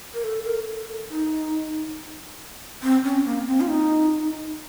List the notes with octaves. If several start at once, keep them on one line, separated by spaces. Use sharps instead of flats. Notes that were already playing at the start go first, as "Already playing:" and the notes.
A#4
A4
A#4
A4
D#4
C4
C#4
A#3
C4
F4
D#4